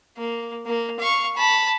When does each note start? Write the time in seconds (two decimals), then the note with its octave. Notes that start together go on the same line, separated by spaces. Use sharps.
0.17 A#3
0.66 A#3
1.00 F5 C#6
1.37 A5 B5